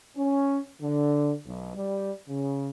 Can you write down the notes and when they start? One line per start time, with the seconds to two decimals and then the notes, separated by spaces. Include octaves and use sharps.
0.17 C#4
0.81 D3
1.46 B1
1.76 G3
2.29 C#3